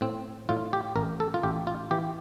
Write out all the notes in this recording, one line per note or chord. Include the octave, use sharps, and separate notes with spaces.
A2 C4
A2 F4
G4
A1 A#4
A4
F4
A1 G4
F4
E3 G4